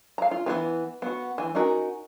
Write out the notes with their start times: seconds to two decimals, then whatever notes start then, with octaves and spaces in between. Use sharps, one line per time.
0.18 F5 A#5
0.31 F4
0.46 E3 A3 B3 E4 B4
1.02 B3 F#4
1.38 E3 G#5
1.55 C#4 D#4 F#4 A#4